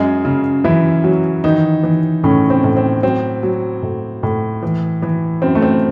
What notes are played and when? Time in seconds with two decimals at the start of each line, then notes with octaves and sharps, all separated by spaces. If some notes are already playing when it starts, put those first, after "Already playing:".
Already playing: F#2 G#3 G#4
0.25 C#3
0.64 F#2 E3 E4
1.04 F#3
1.44 D#3 E3 D#4
1.83 E3
2.24 A2 C#3 C#4
2.50 C4
2.64 A2
2.77 C4
3.03 F#3 C4
3.43 F#3
3.83 A2
4.23 A2
4.63 E3
5.02 E3
5.42 F#2 C4
5.55 A3
5.62 C4